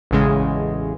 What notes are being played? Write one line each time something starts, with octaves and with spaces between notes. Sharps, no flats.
A1 E2 C#3 G#3